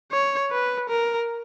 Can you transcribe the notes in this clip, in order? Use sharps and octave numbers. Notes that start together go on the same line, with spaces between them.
C#5
B4
A#4